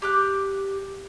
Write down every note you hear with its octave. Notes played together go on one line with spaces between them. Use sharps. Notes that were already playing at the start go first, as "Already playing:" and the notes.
G4 D6 F#6